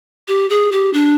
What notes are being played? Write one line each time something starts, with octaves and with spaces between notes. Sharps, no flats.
G4
G#4
G4
D4